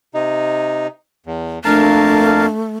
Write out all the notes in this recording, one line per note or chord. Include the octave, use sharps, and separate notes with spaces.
C3 D#4
E2
F2 A3 A#3 D4 A#4 F5 A5